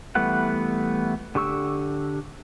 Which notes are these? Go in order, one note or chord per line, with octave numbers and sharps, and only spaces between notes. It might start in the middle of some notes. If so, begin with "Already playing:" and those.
E3 G3 A3 B3 F#5
D3 G4 C#6 E6